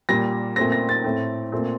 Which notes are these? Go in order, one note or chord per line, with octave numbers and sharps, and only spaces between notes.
A#2 G3 A#3 A#6
A#2 A3 C4 A#6
A#6
A6
A2 A3 C4
A#2 A3 C4